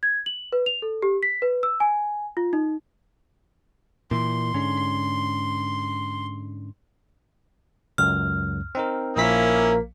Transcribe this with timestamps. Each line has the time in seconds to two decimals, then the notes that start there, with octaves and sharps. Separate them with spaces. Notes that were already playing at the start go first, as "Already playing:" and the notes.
0.03 G#6
0.26 F#7
0.52 B4
0.66 F7
0.82 A4
1.02 G4
1.23 B6
1.42 B4
1.63 E6
1.80 G#5
2.37 F4
2.53 D#4
4.11 A#2 E3 C6
4.54 G#2 D3 C#4
7.98 C#2 F#2 F6
8.75 C4 D#4 A#4
9.16 A#1 F3 A#3 C#4 E4 B6